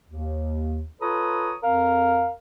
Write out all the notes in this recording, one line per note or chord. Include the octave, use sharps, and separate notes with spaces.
D#2
F4 A4 B4 C#5 A#5 D#6
F2 C4 A#4 F5